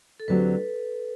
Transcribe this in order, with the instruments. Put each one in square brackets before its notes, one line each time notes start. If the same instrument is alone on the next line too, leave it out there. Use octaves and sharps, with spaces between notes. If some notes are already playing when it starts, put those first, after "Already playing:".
[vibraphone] A4
[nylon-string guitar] D2 D3 F#3 C4 G4 [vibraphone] B4